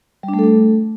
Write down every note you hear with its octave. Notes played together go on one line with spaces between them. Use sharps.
G3
D4
A3
A4
A3